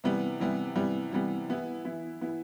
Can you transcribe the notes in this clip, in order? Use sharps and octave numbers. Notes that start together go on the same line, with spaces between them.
C3 E3 G3 B3
C3 E3 G3 B3
C3 E3 G3 B3
C3 E3 G3 B3
E3 B3 E4
E3 B3 E4
E3 B3 E4